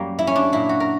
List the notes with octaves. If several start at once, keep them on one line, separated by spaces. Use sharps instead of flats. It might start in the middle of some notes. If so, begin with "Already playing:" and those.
Already playing: F#2 G3 A#3
E4
C#4
D4
A#2 A#3 E4
F#4
A#4